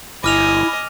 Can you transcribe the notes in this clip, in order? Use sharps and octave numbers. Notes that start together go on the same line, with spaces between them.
G1 E4 D#5 G#5 D6 F6 F7